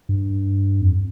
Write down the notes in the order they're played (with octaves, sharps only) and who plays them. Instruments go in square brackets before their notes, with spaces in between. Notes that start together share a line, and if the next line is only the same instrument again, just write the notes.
[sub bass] G2
F2